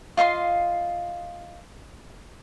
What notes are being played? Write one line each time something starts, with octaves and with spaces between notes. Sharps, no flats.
F4 D#5 F5 C6